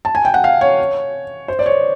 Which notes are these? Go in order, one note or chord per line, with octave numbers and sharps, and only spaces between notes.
A5
G#5
G5
F#5
F5
C#5
C5
D5
C#5